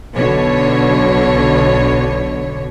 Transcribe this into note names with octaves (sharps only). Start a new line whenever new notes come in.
B1 B2 D3 C#5